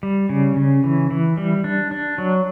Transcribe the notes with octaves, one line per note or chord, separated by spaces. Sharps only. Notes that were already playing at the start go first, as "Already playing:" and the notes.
G3
C#3
C#3
E3
E3
G3
D4
D4
F#3